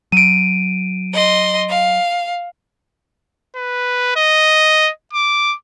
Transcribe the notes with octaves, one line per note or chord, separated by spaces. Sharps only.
F#3 D7 D#7
D#5 C6
F5
B4
D#5
D6